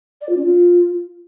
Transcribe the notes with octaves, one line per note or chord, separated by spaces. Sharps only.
D5
F4
C#4
F4